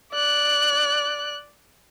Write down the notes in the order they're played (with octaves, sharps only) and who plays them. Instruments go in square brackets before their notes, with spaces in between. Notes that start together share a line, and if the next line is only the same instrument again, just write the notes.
[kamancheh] D5 F#6